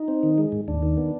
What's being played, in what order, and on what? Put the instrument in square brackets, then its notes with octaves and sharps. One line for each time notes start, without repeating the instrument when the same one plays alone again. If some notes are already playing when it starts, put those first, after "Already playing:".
Already playing: [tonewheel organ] D#4
C4
D#3
G#3
G#2
D#2 D4
D#3
B3